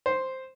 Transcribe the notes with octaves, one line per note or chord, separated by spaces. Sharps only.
C5